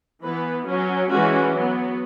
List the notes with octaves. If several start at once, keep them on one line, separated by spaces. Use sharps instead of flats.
E3 B3 B4
F#3 C#4
E3 G#3 C#4 F#4
F#3 B3